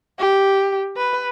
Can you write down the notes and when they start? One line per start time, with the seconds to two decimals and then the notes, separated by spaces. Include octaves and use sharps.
0.19 G4
0.97 B4